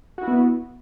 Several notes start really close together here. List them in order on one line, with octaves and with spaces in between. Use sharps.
F#4 E4 B3